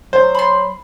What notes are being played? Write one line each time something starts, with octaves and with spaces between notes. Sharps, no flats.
F#3 C5
B5 C6